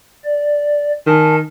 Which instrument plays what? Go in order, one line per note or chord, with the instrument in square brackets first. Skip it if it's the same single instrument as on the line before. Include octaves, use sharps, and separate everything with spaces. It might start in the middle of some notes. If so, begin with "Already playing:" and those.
[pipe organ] D5
[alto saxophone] D#3 [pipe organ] G#5 A5